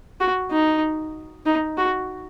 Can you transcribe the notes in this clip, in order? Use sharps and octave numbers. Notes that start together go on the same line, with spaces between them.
F#4
D#4
D#4
F#4